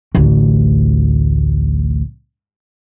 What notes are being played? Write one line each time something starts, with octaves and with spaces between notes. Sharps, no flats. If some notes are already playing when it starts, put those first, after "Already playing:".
A1 D2